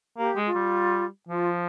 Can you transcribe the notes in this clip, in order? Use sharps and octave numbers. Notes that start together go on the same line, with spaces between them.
A#3 G4
G#3
F4
G3
F3 F4